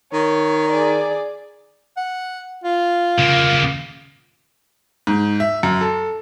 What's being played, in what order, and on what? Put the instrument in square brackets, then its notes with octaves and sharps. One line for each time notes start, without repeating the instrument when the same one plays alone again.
[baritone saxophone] D#3 [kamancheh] C#5
[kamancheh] G#4 D5
[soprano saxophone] F#5
F4
[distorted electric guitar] C#3 A#3
[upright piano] G#2
E5
F#2
A4